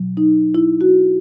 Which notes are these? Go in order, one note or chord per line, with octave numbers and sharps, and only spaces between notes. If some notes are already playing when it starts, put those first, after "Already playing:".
Already playing: B2 F#3
D#4
E4
F#4